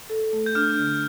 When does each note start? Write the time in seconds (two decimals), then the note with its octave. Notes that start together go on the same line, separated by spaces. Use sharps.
0.10 A4
0.33 A3
0.46 G6
0.55 D4 F6
0.79 D3